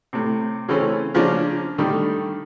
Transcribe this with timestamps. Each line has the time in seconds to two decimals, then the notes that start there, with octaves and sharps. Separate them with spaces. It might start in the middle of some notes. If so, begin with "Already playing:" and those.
0.13 A2 C3
0.68 C#3 E3 A3 C4 C#4
1.14 C#3 F3 A#3 C#4 D4
1.78 D3 D#3 G3 A3